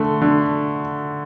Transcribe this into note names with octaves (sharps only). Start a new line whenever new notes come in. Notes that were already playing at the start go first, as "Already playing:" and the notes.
Already playing: D3 A3
D3